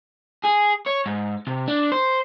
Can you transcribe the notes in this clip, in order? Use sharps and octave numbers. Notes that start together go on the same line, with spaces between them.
G#4
C#5
G#2
C3
D4
C5